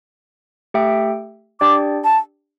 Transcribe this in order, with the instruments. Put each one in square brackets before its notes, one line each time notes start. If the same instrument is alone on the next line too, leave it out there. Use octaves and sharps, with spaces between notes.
[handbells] A3 G4 E5 G5
[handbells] D4 G4 D5 G5 [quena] D6
[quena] A5